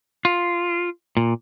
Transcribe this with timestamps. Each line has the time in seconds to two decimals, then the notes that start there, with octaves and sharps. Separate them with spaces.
0.25 F4
1.17 A#2